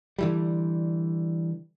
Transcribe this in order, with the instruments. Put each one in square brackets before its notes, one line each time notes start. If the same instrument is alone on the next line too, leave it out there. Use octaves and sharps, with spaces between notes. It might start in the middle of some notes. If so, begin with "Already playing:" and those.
[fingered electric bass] D3 E3 G3